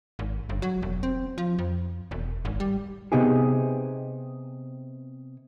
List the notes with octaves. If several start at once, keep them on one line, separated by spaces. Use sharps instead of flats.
G#1
G1
F#3
E1
C4
F3
F2
E1
G#1
G3
C3 B3 D#4 G4 G#4